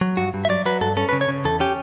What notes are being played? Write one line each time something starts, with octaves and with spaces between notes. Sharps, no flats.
F#3
G2 F#4
G2
E5
F#3 D5
F#3 B4
G2 A4
C#4 A4
B4
C#3
C#5
C#3
E2 A4
C#4 G4